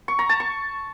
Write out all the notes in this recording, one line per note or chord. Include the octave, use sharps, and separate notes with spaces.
C#6
A#5
A5
C#6